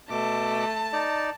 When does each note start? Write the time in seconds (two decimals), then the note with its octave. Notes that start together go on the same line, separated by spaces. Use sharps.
0.10 B2 A3 A5 D6
0.93 D#4 D5